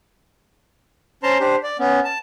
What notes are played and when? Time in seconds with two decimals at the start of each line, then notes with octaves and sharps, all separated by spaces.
1.23 C#4 C5 A5 A#5 C6
1.40 D4 G4 C5
1.63 D5
1.79 B3 C#4
2.04 A5